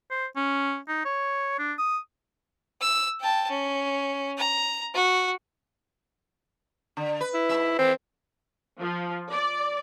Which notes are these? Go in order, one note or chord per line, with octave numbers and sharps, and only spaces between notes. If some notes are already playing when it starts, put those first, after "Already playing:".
C5
C#4
D#4
C#5
D4
D#6
E6
G5 A5
C#4
A#5
F#4
D3
B4
E4
G#2 E5
E3 C4
F3
D5